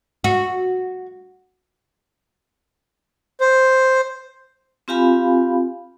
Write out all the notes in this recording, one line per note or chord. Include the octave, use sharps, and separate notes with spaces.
F#4
C5
C4 F4 G4 F5 G#5 B5